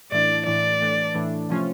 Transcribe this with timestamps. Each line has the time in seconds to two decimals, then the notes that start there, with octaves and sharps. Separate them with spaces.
0.12 A2 E3 A3 D4 D5
0.46 A2 E3 A3 D4 D5
0.80 A2 E3 A3 D4
1.14 A2 E3 A3 D4
1.49 C3 F3 A3 C#4 F4